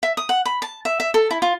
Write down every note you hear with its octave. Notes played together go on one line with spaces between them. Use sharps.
E5
D#6
F#5
B5
A5
E5
E5
A4
E4
F4